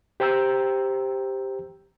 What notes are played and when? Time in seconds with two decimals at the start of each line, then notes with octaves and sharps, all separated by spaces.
0.20 G4 C5 G5 A#5 E6 G6